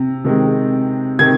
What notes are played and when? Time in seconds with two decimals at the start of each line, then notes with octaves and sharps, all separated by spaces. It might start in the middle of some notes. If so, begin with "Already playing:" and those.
Already playing: C3
0.25 C3 D#3 G#3
1.19 C3 D#3 G#6